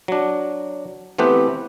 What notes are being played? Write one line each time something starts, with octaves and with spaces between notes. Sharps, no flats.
F#3 D4
E3 A3 B3 C4 G4 B4